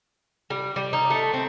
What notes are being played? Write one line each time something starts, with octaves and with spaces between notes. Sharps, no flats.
G3
G3
D#4
A3
C4